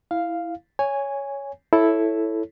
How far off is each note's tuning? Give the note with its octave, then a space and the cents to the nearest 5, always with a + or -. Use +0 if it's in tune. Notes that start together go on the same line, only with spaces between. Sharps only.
E4 +0 F5 -5
C#5 +10 G#5 -10
E4 +0 A4 +0 C#5 +0